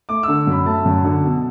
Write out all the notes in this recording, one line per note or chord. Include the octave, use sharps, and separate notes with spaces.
A3 D6
D3 E6
F#2 B5
A3 A5
F#2
D3
B2